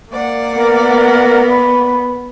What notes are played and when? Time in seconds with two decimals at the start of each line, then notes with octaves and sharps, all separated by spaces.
0.11 A#3 D5 F#5
0.56 B3 A#4
1.50 B5